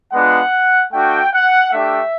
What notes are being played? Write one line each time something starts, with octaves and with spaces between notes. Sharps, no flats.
G#3 B3 D4 F4 F#5
A3 D4 F#4 G5
F#5
A3 D4 G4 E5